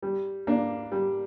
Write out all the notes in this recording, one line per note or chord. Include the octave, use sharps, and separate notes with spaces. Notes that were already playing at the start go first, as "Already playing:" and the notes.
G3
A#3 D4
G3